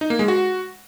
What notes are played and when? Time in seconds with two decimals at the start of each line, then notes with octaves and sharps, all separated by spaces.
0.01 D#4
0.10 A#3
0.19 G#3
0.28 F#4